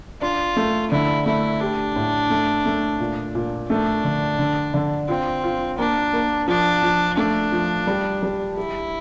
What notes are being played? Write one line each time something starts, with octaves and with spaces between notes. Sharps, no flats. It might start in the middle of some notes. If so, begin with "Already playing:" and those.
D4 F4
A3
D3 E4
A3 E4
D4 G4
A2
A3
A3
A#2
A#2
A3 D4
D3
D3
D3
C4 F4
F4
A#3 D4
A#3
F3 D4
F3
A3 D4
F3
G3
G3
E4 G4